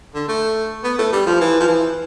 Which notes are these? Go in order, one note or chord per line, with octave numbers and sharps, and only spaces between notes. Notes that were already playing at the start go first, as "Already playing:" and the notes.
D3
A3
B3
A3
G3
F3
E3
F3
E3